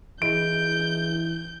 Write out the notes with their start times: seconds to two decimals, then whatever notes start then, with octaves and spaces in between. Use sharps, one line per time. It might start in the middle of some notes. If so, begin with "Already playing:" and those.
0.22 E3 E4 G#4 D#5 G6 D7